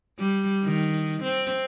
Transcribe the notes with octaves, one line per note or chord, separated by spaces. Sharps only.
G3
D#3
C4